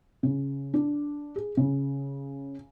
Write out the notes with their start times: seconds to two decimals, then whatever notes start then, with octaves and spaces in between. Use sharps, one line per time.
0.23 C#3
0.74 D4
1.36 G#4
1.57 C#3